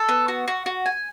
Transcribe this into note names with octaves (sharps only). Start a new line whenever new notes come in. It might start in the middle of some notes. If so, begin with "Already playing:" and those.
Already playing: A4
B3
F#4
F#4
F#4
G#5